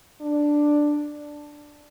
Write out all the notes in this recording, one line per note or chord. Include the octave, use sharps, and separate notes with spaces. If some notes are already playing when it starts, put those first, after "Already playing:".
D4